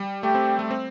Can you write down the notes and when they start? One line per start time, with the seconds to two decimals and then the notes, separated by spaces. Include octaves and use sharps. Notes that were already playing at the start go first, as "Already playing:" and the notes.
Already playing: G3
0.23 A3 G4
0.35 C4
0.59 A3
0.71 C4